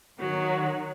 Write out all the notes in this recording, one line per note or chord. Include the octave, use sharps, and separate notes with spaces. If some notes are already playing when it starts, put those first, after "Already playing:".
D#3 F#3